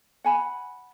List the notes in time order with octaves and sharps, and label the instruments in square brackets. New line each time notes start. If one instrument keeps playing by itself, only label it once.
[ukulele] F#5 G#5 B5